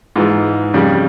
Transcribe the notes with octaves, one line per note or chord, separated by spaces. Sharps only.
G#2 E3 G#3 F4
F2 C#3 G3